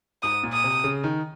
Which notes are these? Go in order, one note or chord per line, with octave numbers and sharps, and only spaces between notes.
G#2 D#6
A#2
D#6
C3
C#3
D#3